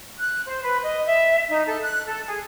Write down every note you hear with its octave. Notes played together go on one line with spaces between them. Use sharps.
F#6
C5
B4
D#5
E5
D#4
A4
F#6
A4
G#4